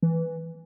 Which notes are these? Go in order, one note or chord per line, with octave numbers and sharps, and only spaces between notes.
E3